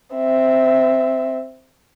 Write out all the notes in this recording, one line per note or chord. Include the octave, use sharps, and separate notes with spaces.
C4 E5